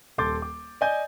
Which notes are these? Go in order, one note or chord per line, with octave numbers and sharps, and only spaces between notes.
D#1 A4 C6 D6 G6 A6
D6
D5 D#5 G#5 G6